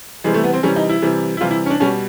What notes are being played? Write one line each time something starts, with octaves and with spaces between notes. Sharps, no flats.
C3 E3 G3 G#3
A3
B3
C4
C3 E3 G3 C#4
D#4
E4
C3 E3 G3
E4
C3 E3 G3 F4
E4
C#4
D4
B2 G3 C#4